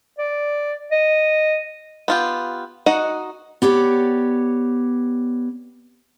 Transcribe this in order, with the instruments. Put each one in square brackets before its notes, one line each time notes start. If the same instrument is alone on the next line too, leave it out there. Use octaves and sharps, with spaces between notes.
[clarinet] D5
D#5
[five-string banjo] B3 F4 G4
D#4 F#4 D#5 F#5
[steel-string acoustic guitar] B3 G4 C#5 D5